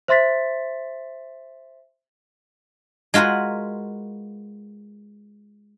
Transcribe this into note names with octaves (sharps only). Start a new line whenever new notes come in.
C5 E5 C6 A6 B6
G#3 F4 F#4 A#4 B4